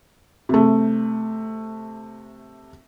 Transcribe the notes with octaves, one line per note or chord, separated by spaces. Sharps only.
C3 A3